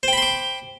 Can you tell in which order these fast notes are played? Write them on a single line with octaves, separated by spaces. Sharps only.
C5 G5 B5 C6 D6